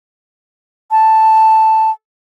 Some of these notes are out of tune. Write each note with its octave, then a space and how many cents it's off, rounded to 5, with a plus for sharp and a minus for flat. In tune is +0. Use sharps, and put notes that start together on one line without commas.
A5 +0